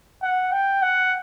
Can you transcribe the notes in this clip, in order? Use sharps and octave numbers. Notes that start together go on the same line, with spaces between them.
F#5
G5
F#5